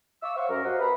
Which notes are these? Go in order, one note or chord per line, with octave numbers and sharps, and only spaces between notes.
E5 F5 C#6 D6 E6
C5 C#5 F5 F#5 C#6
F#2 A#4
F#4 G4 C5 D#5 F5 F#5
B4 C5 E5 A#5 B5